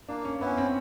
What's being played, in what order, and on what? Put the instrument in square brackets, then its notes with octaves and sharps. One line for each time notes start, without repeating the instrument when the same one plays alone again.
[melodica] A#3 [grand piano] D4
[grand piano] C#4
[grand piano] B3 [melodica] C#4 E4
[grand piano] C4